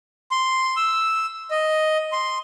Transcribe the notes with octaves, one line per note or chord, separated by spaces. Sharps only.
C6
E6
D#5
C6